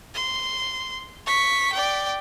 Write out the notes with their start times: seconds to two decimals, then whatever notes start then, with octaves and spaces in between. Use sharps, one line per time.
0.15 C6
1.26 C#6 B6
1.73 D5 G5